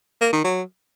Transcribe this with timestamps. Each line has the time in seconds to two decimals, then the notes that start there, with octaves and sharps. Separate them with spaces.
0.21 A#3
0.33 D#3
0.44 F#3